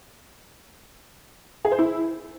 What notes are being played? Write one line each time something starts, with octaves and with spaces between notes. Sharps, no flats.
G#4
C5
E4